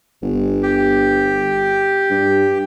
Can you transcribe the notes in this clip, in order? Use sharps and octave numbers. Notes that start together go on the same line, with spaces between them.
G1
G4
G2